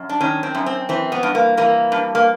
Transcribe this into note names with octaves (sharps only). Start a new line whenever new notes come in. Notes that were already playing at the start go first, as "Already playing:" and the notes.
Already playing: F#2
D4
D#3 C#4
C4
F#2
C4
E3 C4
B3
G2
A#3
E3 A#3
G2
A#3